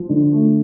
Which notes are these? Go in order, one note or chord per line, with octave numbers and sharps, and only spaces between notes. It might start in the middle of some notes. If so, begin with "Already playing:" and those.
Already playing: F3
D3
A3